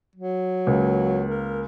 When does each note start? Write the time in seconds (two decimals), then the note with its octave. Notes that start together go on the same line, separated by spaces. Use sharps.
0.16 F#3
0.67 C#2 A#3
1.30 A#4